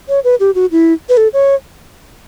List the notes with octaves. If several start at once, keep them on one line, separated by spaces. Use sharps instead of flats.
C#5
B4
G4
F#4
E4
B4
A4
C#5